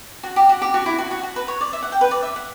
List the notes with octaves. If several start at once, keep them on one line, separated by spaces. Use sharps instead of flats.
F#4
G4
F#4
G4
F#4
E4
F#4
F#4
F#4
B4
C#5
D5
E5
F#5
G5
B4
D5
E5
F#5